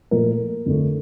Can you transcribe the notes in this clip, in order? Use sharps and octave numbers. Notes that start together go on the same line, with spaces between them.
A#2 F3 A3 A#4
F2 D3 A3